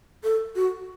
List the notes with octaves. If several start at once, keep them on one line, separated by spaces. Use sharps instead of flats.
A4
F#4